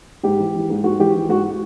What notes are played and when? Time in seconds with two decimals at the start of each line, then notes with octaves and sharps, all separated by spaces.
0.23 G#2 G4
0.39 E3
0.55 E3
0.70 G#2
0.84 G#2 F#4
0.99 E3 G4
1.14 E3
1.29 G#2 F#4